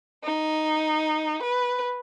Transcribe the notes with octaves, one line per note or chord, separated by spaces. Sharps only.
D#4
B4